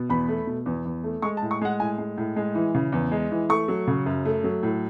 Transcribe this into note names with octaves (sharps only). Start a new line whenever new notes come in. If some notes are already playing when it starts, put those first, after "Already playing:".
Already playing: B2
E2 B5
A3
B2
E2
E2
A3
G#3 C#6
A5
A2
C#6
G#3 F#5
A2 G#5
G#3
A2
G#3
E3
C#3
E2
G#3
E3
A3 C#6
F#3
C#3
F#2
A3
F#3
A2